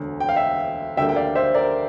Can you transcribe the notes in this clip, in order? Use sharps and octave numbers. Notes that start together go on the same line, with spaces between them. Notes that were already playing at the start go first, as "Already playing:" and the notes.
Already playing: E1 D2 D3
G5
F5
E5 G5
D2 D3 G3 A#3 E5 G5
G5
D5 F5
C5 E5
A#4 D5